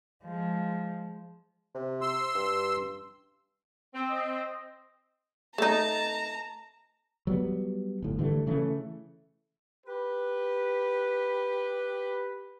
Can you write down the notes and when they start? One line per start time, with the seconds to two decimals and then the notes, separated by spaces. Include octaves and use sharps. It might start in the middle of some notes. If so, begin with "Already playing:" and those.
0.24 F3 G#3
1.75 C3
2.01 C6 E6
2.35 G2
3.94 C4
4.10 D#5
5.58 A3 D#4 A5 A#5
7.27 F#3 G3 B3
8.02 G1 A2
8.19 D3 E3 G3 A3
8.47 C#3 E3 A3
9.87 G4 B4